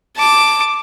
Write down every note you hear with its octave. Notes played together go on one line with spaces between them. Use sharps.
A5 D6